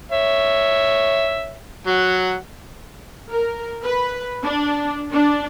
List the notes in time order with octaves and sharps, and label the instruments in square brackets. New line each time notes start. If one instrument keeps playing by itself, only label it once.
[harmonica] C#5 E5
F#3 F#5
[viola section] A#4
B4
D4
D4